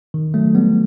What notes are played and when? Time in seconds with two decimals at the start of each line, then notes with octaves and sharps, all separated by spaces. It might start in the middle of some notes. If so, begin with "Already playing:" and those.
0.14 D#3
0.34 F#3 A3
0.55 G3 B3